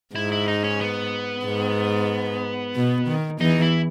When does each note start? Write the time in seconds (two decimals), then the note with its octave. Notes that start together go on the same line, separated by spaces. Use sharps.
0.15 G#2 E4
0.32 E4
0.48 D#4
0.64 C#4
0.81 B3
1.45 G#2
2.75 B2
3.08 D#3
3.40 E2 E3 D#4
3.62 E4